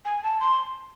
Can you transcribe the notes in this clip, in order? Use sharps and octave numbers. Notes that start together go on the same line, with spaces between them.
G#5
A5
C6